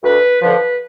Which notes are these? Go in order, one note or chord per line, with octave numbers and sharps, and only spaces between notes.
D2 B4
D3 F3 B4